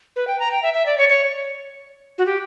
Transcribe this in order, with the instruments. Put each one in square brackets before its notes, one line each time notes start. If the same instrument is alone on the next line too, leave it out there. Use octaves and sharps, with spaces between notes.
[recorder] B4
G5
A#5
G5
E5
E5
D5
C#5
C#5
F#4
G4